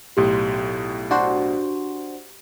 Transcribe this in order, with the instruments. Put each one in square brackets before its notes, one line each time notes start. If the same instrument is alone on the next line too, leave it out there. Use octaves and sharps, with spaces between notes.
[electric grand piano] B1 A2 C6 [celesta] G4
[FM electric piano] D4 F#4 C5